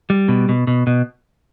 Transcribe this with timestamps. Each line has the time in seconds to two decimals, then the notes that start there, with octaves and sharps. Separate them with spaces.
0.10 G3
0.28 B2
0.49 B2
0.67 B2
0.87 B2